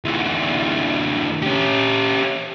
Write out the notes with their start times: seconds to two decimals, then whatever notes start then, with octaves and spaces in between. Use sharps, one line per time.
0.05 D2 E3
1.42 C#4 G4